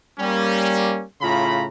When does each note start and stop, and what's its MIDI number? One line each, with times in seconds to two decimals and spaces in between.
0.18 1.03 55
0.18 1.03 58
0.18 1.03 61
1.21 1.66 45
1.21 1.66 49
1.21 1.66 65
1.21 1.66 82
1.21 1.66 83